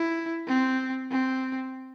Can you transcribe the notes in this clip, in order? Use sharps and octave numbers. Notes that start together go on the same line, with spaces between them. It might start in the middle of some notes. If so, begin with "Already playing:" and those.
Already playing: E4
C4
C4